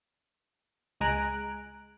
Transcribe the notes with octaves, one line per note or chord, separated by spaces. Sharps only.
C#2 G#3 G#5 A#5 F#6 D7